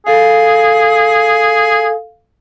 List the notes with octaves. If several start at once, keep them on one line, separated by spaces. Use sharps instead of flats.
G#4 A4 F5